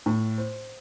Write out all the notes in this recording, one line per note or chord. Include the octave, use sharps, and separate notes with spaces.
A2
C5